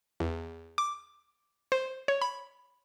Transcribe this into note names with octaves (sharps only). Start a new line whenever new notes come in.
E2
D6
C5
C#5
B5